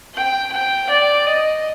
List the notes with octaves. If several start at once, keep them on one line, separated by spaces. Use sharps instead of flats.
G5
G5
D5
D#5